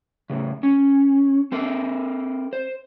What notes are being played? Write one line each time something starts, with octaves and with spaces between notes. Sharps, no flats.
A2 C#3
C#4
C4 A4 A#4
C5